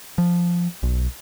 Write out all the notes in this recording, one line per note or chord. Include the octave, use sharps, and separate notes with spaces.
F3
B1